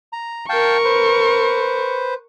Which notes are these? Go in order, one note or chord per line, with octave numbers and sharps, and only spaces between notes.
A#5
A#4 F5 G5 A5 C#6
B4 C5